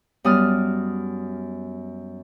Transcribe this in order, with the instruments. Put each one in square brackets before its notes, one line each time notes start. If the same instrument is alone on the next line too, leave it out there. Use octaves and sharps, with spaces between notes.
[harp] F#2 G3 B3 D#6 F6